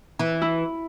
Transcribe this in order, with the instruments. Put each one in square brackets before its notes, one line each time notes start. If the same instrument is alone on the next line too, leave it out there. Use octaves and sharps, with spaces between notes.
[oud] E3
[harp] E4